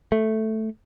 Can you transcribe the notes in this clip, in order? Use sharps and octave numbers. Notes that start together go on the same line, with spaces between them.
A3